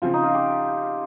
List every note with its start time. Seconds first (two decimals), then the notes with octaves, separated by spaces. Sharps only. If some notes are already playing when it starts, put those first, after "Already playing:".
0.02 C#3 F3 C4 F4
0.14 D#4
0.23 F4
0.34 G4